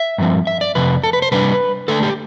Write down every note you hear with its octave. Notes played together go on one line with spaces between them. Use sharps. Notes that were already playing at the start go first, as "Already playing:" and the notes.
Already playing: E5
G2 F3 C4
E5
D5
F2 C3 B4
A4
B4
C5
C3 G3 D4 B4
D3 A3 D4 A4
G4